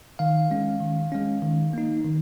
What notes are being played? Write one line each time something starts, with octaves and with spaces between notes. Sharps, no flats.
D#3 F5
G#3 C#4
D#3
G#3 C#4
D#3
A#3 D#4
D#3